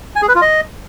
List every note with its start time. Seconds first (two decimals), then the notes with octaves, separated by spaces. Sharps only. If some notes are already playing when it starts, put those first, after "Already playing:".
0.16 G#5
0.22 G#4
0.29 B4
0.35 F4
0.42 D#5